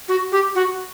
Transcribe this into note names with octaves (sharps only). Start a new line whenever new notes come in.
F#4
G4
F#4